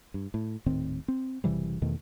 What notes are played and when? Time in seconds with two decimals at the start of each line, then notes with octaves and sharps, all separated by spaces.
0.14 G2
0.34 A2
0.66 D#1 A2 D#3 C4
1.08 C4
1.44 F#1 C3 E3 G3
1.82 E2 B2 D#3 A3